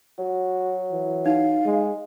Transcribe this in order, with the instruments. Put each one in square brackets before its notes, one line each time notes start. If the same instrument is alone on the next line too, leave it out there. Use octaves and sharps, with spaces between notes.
[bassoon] F#3 [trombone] F#4
[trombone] E3
[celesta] D#4 [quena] F5
[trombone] G#3